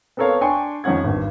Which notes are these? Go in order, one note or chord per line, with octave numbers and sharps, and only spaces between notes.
B3 C4 A4 A#4 C#5 F5
D4 G5 G#5 C6 C#6
F2 D#3 C#4 F#5 G#6
G#1 G2